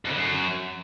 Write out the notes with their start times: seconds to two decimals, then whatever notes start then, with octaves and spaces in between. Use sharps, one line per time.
0.05 F2
0.11 D3
0.16 F#2